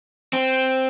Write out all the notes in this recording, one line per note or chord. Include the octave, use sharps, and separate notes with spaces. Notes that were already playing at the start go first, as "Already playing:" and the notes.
C4